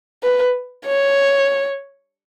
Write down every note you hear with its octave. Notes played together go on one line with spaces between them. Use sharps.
B4
C#5